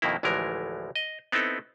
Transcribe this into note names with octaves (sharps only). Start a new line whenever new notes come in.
F2 B2 D#3 A#3 E4
A1 D2 E3 F3 G#3 A#4
D#5
B3 C4 D#4 E4 A4